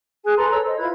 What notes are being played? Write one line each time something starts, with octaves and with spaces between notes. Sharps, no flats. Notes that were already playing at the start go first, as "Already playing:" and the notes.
G#4 G#5 F#6
A4 B4 A#5 C6
A4 C#5 A#5 E6
C5 D#5
E4 F4 B4 G#6